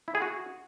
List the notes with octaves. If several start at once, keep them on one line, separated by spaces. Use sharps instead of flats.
E4
G#4
F#4